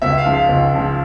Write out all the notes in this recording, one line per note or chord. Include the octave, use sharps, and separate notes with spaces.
C#2 E5
F5
C#3 F3 G#3
F5
C#2
C#3 F3 G#3